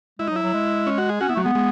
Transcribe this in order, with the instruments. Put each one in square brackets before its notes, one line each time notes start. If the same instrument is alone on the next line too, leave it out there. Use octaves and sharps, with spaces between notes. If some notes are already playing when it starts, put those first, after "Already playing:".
[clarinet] G#3 [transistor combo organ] E4
[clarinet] F#3 [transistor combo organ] D#4
[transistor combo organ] E4
[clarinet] F#3
G#3
[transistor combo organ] C#4
F#4
G#4
[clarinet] C#4 [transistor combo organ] F#4
[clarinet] B3 [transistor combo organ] E4
[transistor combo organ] F#3 [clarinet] A3
[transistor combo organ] G#3 [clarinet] B3
[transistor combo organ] G#3